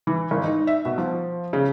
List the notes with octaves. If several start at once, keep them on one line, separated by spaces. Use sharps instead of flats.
E3
G#1
D#4
E5
B2
F3
C#3